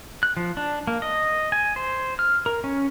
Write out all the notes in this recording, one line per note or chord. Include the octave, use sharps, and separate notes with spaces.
F#6
F3
D4
A#3
D#5
G#5
C5
F6
A#4
C#4